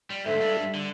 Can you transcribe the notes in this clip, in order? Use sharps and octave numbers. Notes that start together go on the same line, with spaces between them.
G3
D2 G#2 A4 E5
G2 D4
G3
D3